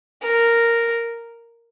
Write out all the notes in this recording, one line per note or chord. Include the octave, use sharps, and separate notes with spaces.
A#4